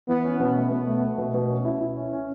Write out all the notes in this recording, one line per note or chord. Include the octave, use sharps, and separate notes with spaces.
E3 B3
C#4
B2 B3
A3
B2 B3
A3
A3
B2
B2
C#4
E4
E4
C#4
C#4